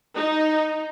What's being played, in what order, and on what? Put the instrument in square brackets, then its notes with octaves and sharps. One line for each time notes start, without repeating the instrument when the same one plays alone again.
[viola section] D#4